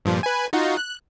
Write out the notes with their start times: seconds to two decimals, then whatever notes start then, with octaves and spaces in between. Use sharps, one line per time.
0.05 G2 A#2 F3
0.23 B4 G#5
0.53 D#4 F4 F#4
0.77 F#6